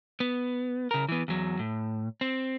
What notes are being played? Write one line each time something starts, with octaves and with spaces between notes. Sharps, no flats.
B3
C#3 A#4
E3 B3
E2 F#3
A2
C4